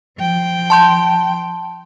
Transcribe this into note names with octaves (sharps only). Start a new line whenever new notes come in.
F3 G5
A5 C6 G6